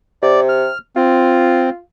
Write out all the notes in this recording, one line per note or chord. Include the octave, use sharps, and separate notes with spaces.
C3 D5
F6
C4 F4